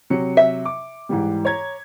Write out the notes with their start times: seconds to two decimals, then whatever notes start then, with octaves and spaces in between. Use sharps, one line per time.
0.10 C3 F#3 C#7
0.37 E5
0.65 D6
1.09 G#2 E3 G3
1.45 C#5 A#5 G#6